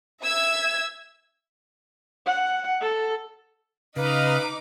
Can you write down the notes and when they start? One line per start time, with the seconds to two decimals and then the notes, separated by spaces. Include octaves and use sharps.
0.22 E5 E6 G#6
2.27 F#5
2.81 A4
3.96 C#3 D#4 B4 D#5 F5 D6